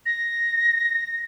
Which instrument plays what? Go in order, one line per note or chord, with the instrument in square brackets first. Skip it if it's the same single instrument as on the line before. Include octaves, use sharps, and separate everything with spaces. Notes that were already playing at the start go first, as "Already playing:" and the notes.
[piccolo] A#6